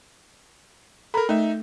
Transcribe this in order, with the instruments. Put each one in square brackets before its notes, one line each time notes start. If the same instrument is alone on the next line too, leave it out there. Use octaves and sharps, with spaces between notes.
[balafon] A4 A#5 [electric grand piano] A#4 B5
[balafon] A3 [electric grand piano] D#4 E5